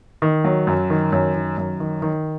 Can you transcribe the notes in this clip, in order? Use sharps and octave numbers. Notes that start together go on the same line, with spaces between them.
D#3
F#3
F#2
D#3
F#2
D#3
F#2
D#3
D#3